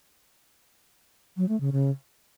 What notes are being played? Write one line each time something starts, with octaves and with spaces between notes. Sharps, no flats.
F#3
A3
C#3
C#3